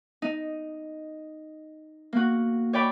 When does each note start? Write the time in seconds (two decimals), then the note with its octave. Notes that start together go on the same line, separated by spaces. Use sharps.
0.22 D#4
2.13 A#3 F#4
2.73 C#5 D5 G5 B5 D6